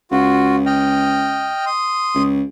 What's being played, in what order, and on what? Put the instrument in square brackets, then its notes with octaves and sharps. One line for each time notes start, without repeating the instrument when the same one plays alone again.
[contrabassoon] C#2 [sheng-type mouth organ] F4 F#4
[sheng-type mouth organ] D#5 G5 F6
C6 D#6
[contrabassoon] C#2